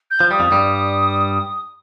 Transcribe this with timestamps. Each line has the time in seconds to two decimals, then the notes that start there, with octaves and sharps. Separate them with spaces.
0.10 G6
0.20 F3
0.31 G3 D#6
0.40 F2 F3
0.51 G2 G3